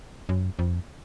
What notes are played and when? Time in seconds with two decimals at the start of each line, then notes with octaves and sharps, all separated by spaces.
0.29 F#2
0.59 F2